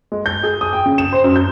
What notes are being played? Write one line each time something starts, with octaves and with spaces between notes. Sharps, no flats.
G#3
G6
G#4
D#6
G5
C#3
E7
C5
F#2
G6